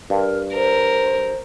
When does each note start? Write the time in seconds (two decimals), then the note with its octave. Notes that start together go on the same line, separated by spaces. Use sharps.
0.10 G2 A#4
0.54 A#4 C5